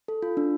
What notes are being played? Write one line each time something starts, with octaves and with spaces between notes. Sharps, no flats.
A4
F4
D4